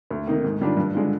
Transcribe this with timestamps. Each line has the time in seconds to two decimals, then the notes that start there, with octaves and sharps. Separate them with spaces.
0.11 D2
0.27 C3 D#3 A#3 D#4
0.44 G#2
0.61 D#3 G3 D4 F4
0.77 G2
0.94 D3 G#3 D4 F4